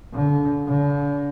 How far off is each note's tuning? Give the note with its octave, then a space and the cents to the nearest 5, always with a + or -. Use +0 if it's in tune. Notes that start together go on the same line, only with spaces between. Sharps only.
D3 -35
D3 -40